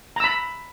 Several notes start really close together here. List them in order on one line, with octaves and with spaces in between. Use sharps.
A#5 E6 B5